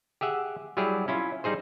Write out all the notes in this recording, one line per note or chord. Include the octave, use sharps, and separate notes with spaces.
G4 G#4 E5 F#5
F#3 G3 E4 G4 G#4
C#4 E4 F4
G3 D#4 G#4 C5